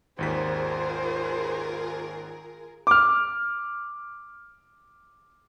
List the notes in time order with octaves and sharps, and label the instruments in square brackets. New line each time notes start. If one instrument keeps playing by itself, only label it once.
[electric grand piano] G#1 D#2 B6 [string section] F4 G#4 A#4 [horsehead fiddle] C5
[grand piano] D6 F6